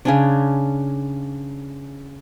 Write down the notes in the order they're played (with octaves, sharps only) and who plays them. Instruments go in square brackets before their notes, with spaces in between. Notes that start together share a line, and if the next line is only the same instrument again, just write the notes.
[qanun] C#3 C#4 D4